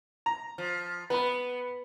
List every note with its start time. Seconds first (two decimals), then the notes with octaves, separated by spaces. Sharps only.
0.26 A#5
0.58 F3
1.10 B3 B4 B5